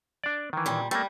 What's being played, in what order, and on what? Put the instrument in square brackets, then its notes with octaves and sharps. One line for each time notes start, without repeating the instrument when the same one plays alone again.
[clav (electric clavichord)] D4 D5
D#3 E3
[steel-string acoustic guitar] A#2 G3
[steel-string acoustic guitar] G3 [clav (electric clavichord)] A3 A#3